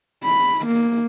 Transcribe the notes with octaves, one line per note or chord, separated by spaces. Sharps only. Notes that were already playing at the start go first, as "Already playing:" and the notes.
B5
A#3